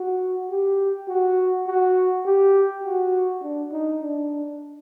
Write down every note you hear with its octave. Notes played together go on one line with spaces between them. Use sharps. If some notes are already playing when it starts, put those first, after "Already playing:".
Already playing: F#4
G4
F#4
F#4
G4
F#4
D4
D#4
D4